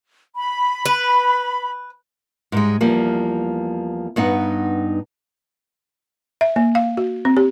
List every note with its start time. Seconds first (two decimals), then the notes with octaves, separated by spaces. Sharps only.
0.36 B5
0.86 B4
2.52 G#2 G3 G#3
2.81 E2 F3 G3 A#3
4.16 G2 B3 D#4 F#5
6.41 E5
6.56 A#3
6.75 F5
6.97 F#4
7.25 C4
7.37 G4